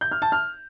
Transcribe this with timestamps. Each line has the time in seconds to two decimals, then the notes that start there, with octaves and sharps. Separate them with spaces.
0.01 G6
0.12 F6
0.22 A5
0.32 F6